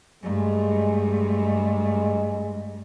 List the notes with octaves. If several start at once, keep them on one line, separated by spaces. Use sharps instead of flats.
G2 G#3 A3